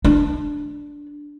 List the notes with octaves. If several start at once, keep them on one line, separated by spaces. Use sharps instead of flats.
D4